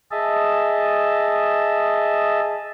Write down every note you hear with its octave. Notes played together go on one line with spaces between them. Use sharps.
G#4 D#5 E5 A5